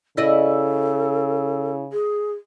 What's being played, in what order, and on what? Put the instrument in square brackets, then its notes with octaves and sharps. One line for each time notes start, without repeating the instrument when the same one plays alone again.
[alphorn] C#3 [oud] E4 D5 D#5 [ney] A4
[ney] G#4